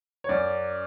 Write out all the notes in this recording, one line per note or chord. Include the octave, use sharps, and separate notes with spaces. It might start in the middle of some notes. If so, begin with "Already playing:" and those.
C#5
F#2 D5